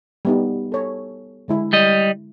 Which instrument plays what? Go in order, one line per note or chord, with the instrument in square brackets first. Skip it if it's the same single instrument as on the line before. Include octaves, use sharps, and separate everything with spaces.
[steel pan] G3 B3 D#4
A4 C#5
D3 G#3 E4
[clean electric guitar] G3 D#5